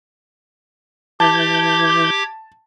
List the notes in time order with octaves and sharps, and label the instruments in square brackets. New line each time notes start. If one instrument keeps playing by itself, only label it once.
[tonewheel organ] E3 G6 [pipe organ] G4 D6 G#6 [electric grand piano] A5